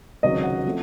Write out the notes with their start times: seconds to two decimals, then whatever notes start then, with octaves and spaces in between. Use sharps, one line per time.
0.23 C#2 C3 D#3 F#3 D#5
0.44 F#5
0.66 F3 A3 C4